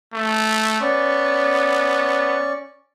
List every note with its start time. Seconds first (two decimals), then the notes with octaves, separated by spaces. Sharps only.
0.14 A3
0.81 B3 C#4 D5 C#6